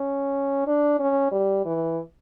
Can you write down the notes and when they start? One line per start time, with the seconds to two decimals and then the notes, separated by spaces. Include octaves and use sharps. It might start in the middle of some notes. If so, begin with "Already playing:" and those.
Already playing: C#4
0.67 D4
0.99 C#4
1.31 G3
1.65 E3